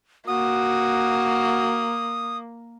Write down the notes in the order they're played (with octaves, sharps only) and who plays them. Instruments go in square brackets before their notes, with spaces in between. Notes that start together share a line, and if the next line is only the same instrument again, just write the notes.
[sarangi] A#3 [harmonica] F#4 [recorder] D#6